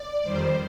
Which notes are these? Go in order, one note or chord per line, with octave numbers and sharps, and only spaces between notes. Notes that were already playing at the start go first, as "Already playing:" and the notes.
Already playing: D5
F2 D#3 G3 C5